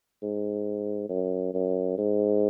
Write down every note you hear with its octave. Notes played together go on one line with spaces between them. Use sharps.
G#2
F#2
F#2
G#2